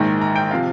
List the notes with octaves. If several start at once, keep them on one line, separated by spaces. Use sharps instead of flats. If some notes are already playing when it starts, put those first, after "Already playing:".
Already playing: A#1 G#2 D#3 A#5
A#5
G5
C3 F3 F5